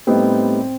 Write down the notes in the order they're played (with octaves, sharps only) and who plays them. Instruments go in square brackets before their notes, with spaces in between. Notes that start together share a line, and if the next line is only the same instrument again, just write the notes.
[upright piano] A2 G3 B3 D#4 [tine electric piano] C4